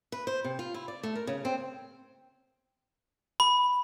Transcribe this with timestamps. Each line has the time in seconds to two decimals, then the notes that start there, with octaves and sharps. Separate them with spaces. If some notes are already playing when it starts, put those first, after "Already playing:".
0.12 B4
0.27 C5
0.44 C3
0.59 F4
0.74 E4
0.88 D5
1.03 A3
1.15 A#4
1.27 C#3
1.45 C4
3.40 B5